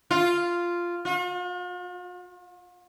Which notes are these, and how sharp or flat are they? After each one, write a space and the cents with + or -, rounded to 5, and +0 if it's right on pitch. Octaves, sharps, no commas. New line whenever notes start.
F4 -5
F4 +45